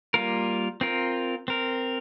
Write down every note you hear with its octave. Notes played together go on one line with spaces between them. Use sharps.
G3 A#3 F4 A#4
C4 F4 A#4
C4 A#4